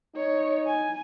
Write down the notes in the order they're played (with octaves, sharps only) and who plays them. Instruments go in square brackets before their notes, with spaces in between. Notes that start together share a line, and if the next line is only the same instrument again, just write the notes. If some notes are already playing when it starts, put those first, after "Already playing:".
[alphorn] D#4 [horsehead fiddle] C#5
[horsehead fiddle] G#5